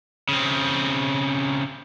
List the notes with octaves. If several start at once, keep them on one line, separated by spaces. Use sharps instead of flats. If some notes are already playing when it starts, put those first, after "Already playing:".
C#3 C4